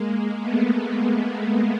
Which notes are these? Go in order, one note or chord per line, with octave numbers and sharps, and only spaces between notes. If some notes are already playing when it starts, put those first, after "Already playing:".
Already playing: G#3 A#3
A3 B3